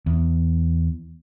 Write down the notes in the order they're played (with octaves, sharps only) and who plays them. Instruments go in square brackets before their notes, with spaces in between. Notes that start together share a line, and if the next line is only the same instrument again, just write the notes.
[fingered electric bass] E2